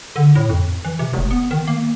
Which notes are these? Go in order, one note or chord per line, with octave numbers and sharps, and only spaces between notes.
D3
A2
F2
E3
C3
F1
B3
D#3
A#3